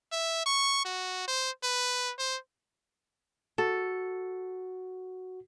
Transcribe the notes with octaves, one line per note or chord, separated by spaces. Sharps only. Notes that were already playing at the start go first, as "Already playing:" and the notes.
E5
C#6
F#4
C5
B4
C5
F#4 A4